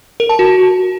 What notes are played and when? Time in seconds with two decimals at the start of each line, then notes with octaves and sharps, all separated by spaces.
0.20 A#4
0.29 A5
0.39 F#4